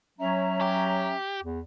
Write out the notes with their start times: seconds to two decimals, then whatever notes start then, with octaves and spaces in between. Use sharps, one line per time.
0.19 F#3 C#4 E5 A#5
0.61 G4
1.43 E2